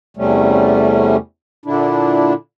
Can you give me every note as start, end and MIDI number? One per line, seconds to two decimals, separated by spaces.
0.17 1.16 40
0.17 1.16 48
0.17 1.16 55
0.17 1.16 57
0.17 1.16 61
1.66 2.33 46
1.66 2.33 50
1.66 2.33 62
1.66 2.33 64